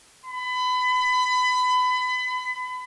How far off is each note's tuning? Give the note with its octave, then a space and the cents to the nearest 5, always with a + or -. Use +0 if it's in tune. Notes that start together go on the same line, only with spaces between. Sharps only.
B5 +30